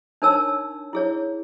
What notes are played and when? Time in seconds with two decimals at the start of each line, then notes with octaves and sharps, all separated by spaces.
0.22 D4 D#4 A#4 C#5 A5 E6
0.93 E4 G#4 C#5